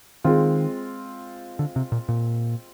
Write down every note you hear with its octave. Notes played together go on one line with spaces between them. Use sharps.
D#3 G#3 C4 F4
D3
C3
A#2
A#2